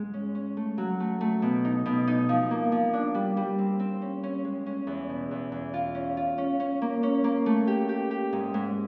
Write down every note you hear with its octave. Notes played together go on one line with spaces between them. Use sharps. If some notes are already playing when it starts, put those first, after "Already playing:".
Already playing: G#2 G#3
C#4
C#4
A3
F#3
A3
A3
B2
D#4
B2
D#4
F3
A#3
F3
D4
G3
G3
C4
C4
C#4
C#4
G#3
C#4
E2
B2
E2
E2
F4
C#4
F4
C#4
C#4
A#3
C#4
A#3
A3
G4
G4
G4
G#2
G#2